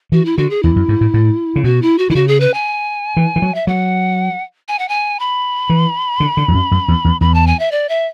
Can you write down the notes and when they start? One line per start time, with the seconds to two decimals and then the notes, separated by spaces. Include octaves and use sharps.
0.12 E3 F#4
0.25 E4
0.37 D3 F#4
0.50 G#4
0.63 E2 E4
0.76 F#2
0.89 G#2
1.01 A2
1.14 A2
1.56 C#3
1.64 B2 F#4
1.82 E4
1.98 F#4
2.10 D3 E4
2.15 C#3 F#4
2.28 G#4
2.40 B4
2.54 G#5
3.17 E3
3.36 E3
3.42 F#3
3.54 E5
3.67 F#3 F#5
4.68 G#5
4.79 F#5
4.89 G#5
5.19 B5
5.70 E3
6.20 D3
6.37 D3
6.48 E2
6.54 F#2
6.71 F#2
6.88 E2
7.05 E2
7.21 E2 B5
7.34 A5
7.47 G#5
7.59 E5
7.71 D5
7.89 E5